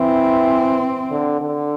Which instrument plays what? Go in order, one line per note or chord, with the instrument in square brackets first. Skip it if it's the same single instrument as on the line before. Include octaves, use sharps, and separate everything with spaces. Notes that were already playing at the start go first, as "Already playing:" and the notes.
Already playing: [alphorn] E3 [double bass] C4
[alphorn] D3
D3